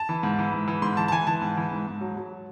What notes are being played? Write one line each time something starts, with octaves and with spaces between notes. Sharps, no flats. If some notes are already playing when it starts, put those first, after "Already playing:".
Already playing: A5
E3
G#2
E3
G#2
E3
G#2 C6
E3 A5
A5
E3 G#5
E3 A5
G#2
E3
G#2
G#2
F#3
F#3